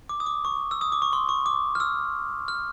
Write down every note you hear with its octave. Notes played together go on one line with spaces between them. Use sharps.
D6
D#6
D6
C#6
E6
D#6
D6
C#6
C6
C#6
D6
F6
E6
F6